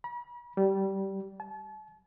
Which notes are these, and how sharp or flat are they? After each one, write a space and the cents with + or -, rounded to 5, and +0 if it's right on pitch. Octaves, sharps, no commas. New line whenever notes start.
B5 -45
G3 -15
A5 -40